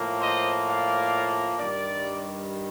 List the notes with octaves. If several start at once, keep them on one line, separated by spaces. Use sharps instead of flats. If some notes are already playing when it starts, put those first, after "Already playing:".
Already playing: A2 F3 A#3
C5 D#5
D5 F5
G2 D#3 G3 A#4 D5